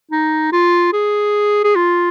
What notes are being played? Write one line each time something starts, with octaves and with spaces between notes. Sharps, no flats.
D#4
F4
G#4
G#4
F4